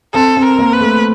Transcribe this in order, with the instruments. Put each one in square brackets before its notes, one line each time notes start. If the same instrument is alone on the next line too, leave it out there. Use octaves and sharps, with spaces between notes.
[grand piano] C4 [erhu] A4
[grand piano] C4
[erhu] A#4
[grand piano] A#3
[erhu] B4
[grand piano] A3